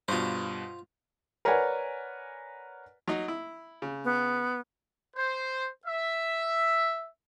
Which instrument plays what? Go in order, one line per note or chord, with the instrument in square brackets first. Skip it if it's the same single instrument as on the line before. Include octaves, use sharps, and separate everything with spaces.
[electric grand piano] G2 B2 [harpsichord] F4 C5
[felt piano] A#4 B4 C#5 D5 F#5 G#5
[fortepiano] F#3 D#4
E4
C#3
[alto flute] B3
[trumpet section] C5
E5